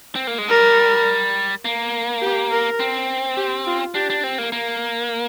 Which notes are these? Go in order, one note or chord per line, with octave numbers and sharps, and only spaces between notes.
C4
A#3
G#3
G3 A#4
A#3
G4
A#4
C4
G4
F4
D4 G4
D4
C4
A#3
A#3